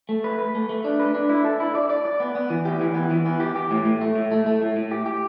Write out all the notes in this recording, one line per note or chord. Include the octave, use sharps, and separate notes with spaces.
A3
B4
B4
A3
A3
D4
B4
D4
E4
A4
E4
D5
D5
D5
B3
B3
E3
G4
E3
B3
E3
B3
G4
G4
A2
A2
A3
A2
A3
A3
A2
A2
G4
G4